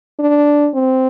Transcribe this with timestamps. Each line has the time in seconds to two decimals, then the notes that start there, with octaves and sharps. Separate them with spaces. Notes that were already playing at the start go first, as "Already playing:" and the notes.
0.19 D4
0.74 C4